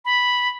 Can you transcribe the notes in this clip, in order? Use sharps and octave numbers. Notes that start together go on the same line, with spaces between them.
B5